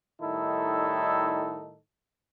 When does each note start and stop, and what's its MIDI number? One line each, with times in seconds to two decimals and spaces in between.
0.21 1.77 45
0.21 1.77 51
0.21 1.77 55
0.21 1.77 63
0.21 1.77 64
0.21 1.77 69